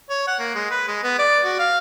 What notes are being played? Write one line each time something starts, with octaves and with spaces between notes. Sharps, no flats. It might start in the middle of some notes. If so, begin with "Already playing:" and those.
C#5
F#5
A#3
G#3
B4
G#3
B3
D5
F#4
F5